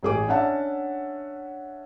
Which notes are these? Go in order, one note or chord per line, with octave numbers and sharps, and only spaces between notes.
A1 G#4 D6
C#4 D4 E5 F#5 A5